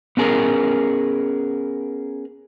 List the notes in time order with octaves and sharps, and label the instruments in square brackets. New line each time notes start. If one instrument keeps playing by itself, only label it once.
[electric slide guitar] B3 C#4 G#4 A#4 B4